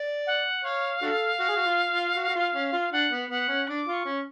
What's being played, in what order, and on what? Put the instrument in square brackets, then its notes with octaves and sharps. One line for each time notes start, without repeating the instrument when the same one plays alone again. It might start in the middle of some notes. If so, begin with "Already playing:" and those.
Already playing: [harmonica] D5
[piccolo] F#5
[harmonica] C#5 [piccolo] F5
[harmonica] D4 F#4 A4
F#4
G#4
F#4
F4
F4
F#4
F#4
F4
C#4
F4
[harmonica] D4 [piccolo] F#5
[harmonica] B3
[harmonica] B3 [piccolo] F#5
[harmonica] C#4
[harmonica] D4 [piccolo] D6
[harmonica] F4
[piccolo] C#6
[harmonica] C#4